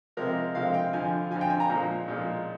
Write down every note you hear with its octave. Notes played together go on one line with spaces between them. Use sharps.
C3 F3 G#3 A#4
C3 F3 G#3 F5
G5
F2 D3 F3 G#5
F2 D3 F3 G#5
G5
G#5
A#5
A#2 F3 G#3
A#2 F3 G#3